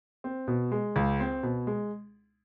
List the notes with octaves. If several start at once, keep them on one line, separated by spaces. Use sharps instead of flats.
C4
B2
G#3
C#2
C4
B2
G#3